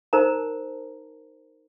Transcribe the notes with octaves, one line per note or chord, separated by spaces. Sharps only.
D#4 A#4 C5 A5 A#5